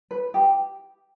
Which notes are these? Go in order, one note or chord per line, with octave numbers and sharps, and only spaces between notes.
B4
G4